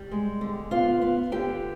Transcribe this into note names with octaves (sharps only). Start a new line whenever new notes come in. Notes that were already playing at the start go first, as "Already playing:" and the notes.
Already playing: G3
G#3
D3
B3 F4 F5
B3
D3 G4 G5